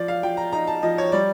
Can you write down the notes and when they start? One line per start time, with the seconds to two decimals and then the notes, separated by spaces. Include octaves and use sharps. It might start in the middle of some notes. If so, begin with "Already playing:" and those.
Already playing: F3 F4 D5
0.08 F5
0.23 F3 G5
0.37 A#5
0.52 D#4 A#5
0.67 A5
0.82 F3 D#5
0.98 C#5
1.12 G3 D5